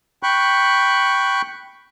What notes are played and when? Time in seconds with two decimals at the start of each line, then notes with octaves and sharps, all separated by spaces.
0.23 G5 B5 C#6 F#6